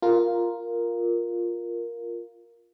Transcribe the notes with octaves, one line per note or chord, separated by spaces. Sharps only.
F4 A#4